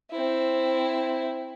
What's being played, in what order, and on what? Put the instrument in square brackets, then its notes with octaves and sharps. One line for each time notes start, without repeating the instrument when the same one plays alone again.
[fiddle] C4 E4